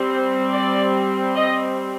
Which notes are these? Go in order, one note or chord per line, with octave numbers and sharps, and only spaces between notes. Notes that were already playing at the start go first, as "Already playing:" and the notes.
Already playing: G3 C4
C5
D5
D#5